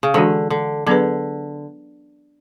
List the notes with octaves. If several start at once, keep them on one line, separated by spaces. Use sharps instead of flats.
C#3
D3 E3 G#3 D4 F#4
D3
D3 F#3 B3 D4 G#4 B4